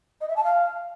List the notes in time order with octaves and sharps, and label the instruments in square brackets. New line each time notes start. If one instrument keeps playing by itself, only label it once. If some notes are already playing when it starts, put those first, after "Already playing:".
[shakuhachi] D#5
E5
A5
F5